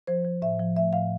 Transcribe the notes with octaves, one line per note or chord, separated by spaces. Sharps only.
F3 C5
F3
A2 E5
F3
A3 E5
A2 F5